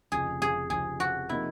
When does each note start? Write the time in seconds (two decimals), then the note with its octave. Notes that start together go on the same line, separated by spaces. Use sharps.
0.12 F1 F2 C#3 F3 G#4
0.42 G#4
0.70 F1 F2 C#3 F3 G#4
1.00 F#4
1.29 C3 F3 A#3 D#4 E4